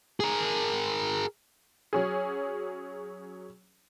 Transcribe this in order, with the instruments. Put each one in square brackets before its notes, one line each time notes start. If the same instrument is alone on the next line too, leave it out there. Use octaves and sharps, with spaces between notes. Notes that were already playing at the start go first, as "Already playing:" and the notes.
[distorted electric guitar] G#4 A#4
[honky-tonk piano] F#3 C#4 G#4